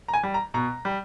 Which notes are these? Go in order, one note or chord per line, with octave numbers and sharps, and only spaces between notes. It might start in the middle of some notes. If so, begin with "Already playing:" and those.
A#5
G#5
G3
A#5
B2 A#5
G3